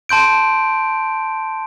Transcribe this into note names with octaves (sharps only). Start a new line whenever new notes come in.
A5 C6 G6 D7